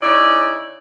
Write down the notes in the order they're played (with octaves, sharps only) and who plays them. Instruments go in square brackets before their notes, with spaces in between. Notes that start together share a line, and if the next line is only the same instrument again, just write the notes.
[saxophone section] C#3 C#4 D#4 E4 D5